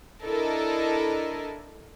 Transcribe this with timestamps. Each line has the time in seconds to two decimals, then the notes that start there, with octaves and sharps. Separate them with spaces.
0.25 D4 E4 A4 A#4 D#5